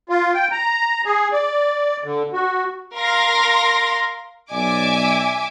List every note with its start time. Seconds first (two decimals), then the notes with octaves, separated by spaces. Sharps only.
0.09 F4
0.34 G5
0.52 A#5
1.05 G#4
1.32 D5
2.04 D3
2.33 F#4
2.96 A#4 F5 C6 A#6
4.51 B1 D5 E5 G#5 D6